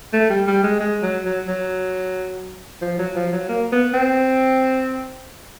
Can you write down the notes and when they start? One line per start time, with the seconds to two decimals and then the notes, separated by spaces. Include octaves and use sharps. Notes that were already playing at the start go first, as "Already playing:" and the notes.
0.13 A3
0.30 G3
0.47 G3
0.64 G#3
0.80 G#3
1.02 F#3
1.25 F#3
1.48 F#3
2.82 F3
2.98 F#3
3.16 F3
3.33 F#3
3.49 A#3
3.72 B3
3.94 C4